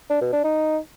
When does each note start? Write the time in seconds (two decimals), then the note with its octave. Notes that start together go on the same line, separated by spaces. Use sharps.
0.10 D4
0.21 B2
0.33 D4
0.44 D#4